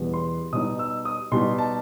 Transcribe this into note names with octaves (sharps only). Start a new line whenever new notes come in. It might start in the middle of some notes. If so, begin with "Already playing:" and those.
Already playing: E2 B2 G3 B3
C6
B2 G3 D#4 D#6
E6
D#6
B2 G3 D#4 C6
A5